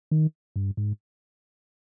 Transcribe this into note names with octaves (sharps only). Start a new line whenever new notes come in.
D#3
G2
G#2